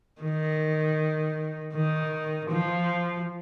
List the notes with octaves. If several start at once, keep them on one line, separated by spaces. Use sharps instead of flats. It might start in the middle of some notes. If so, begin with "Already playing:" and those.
D#3
D#3
F3